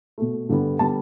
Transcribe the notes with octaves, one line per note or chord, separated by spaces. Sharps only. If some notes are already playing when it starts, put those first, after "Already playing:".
B2 A3
G2 D3 G3 B3
D3 G3 B3 A5